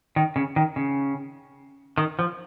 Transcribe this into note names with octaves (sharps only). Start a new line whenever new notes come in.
D#3
C#3
D#3
C#3
D#3
F3